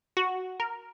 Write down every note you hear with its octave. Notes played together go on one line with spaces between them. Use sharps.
F#4
A#4